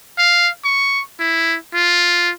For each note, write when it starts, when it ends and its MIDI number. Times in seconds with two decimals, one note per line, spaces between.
0.18 0.49 77
0.64 1.01 85
1.19 1.57 64
1.74 2.31 65